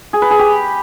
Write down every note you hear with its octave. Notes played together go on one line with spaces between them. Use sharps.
G#4
B4
G#4
G4